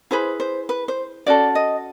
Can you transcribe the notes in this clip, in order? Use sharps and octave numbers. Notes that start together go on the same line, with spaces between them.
E4 G#4 B4 C5
C5
B4
C5
C#4 F#4 A4 D5
D#5